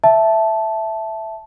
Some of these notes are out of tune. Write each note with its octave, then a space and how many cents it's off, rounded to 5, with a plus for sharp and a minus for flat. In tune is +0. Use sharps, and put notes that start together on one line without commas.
E5 +0 A5 -10